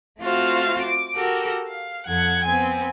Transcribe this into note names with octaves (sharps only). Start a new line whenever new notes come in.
A3 C4 F4 F#4 C5 F5
D6
F#4 G4 A4 A#4
F5
F2 A4 F#5 G#6
B3 C4 G#5